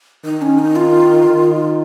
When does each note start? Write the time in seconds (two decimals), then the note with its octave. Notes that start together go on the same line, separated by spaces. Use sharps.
0.25 D#3 D#4
0.42 C#4
0.59 D#4
0.76 F4
1.27 D#3